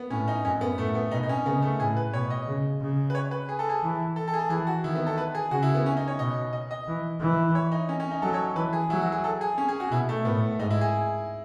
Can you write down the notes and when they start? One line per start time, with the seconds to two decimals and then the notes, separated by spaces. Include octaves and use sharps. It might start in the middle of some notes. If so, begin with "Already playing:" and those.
Already playing: B3
0.10 A2 C#4
0.28 D#4
0.45 F#2 C#4
0.61 B3
0.78 A2 A3
0.95 B3
1.11 B2 D#4
1.23 D#4
1.29 C#4
1.45 C#3 B3
1.62 A3
1.80 A2 G#4
1.97 B4
2.13 B2 C#5
2.30 D#5
2.48 C#3
2.81 C#3
3.10 B4
3.15 C#5
3.31 B4
3.49 G#4
3.59 A4
3.69 G#4
3.83 E3
4.16 A4
4.28 A4
4.34 G#4
4.39 A4
4.50 E3 G#4
4.67 F#4
4.84 D#3 E4
4.96 B3
5.07 A4
5.18 B4
5.35 G#4
5.51 C#3 F#4
5.62 E4
5.75 B3
5.86 C#4
5.97 D#4
6.08 C#5
6.19 B2 D#5
6.53 D#5
6.71 D#5
6.88 E3
7.20 E3
7.55 C#5
7.72 D#4
7.89 C#4
8.00 C#4
8.11 D#4
8.22 F#3 A4
8.34 C#5
8.56 E3 B4
8.73 G#4
8.90 F#3 E4
9.01 F#4
9.12 G#4
9.24 A4
9.41 G#4
9.58 C#4
9.69 G#4
9.80 F#4
9.91 B2 E4
10.09 A3
10.25 A2 B3
10.59 G#2 D#4
10.70 E4
10.81 G#4